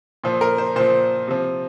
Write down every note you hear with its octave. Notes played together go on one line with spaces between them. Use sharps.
A#2 F3
A#4
C5
A#2 F3 C5
C3 F3